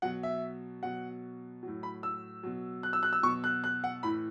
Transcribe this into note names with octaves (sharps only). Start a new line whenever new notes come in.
B2 F#3 F#5
E5
B2 F#3 F#5
A2 F#3
B5
E6
B2 F#3
F#6
E6
F#6
E6
B2 F#3 C#6
F#6
F#6
F#5
A2 E3 B5